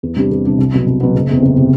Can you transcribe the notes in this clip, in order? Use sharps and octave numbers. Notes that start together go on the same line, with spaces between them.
E2
C3 G3 D4 G4
E2
C3 G3 D4 G4
C2
B2 F#3 B3
C2
B2 F#3 B3
F#1
E2 C3
F#1
C3